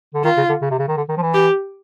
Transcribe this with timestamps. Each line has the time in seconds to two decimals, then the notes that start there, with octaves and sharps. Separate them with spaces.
0.14 D3
0.24 D#3 F4
0.37 C#3
0.49 D3
0.61 C#3
0.71 C3
0.78 C#3
0.88 D#3
0.97 D3
1.09 D#3
1.17 F3
1.22 E3
1.34 G4